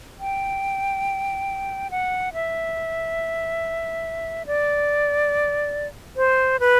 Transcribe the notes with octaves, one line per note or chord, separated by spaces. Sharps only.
G5
F#5
E5
D5
C5
B4